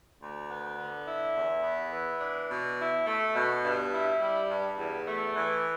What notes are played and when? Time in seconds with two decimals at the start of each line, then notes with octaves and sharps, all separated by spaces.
0.21 D2
0.49 B3
0.78 D3
1.06 E4
1.35 E2
1.63 B3
1.92 E3
2.20 D4
2.49 B2
2.78 E4
3.07 A3
3.35 B2
3.63 G2
3.92 E4
4.21 G3
4.49 G2
4.78 E2
5.06 A3
5.35 E3